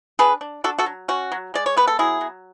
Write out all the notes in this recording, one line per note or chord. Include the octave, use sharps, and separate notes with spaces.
D4 G#4 B4
D4
D4 F#4 A4
F#4 A4
F#3
C#4 F#4
F#3
G#3 D5
C#5
B3 B4
A4
F#3 E4 G#4
F#3